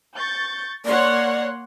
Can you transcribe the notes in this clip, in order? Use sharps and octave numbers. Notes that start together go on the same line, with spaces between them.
C#6 G6 A6
A#3 C#5 D5 F#5 C6